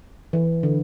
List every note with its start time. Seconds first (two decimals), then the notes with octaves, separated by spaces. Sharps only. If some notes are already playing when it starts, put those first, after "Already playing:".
0.33 E3
0.63 D3